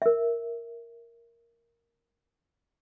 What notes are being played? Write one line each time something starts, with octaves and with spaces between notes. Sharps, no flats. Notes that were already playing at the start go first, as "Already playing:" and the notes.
A#4 E5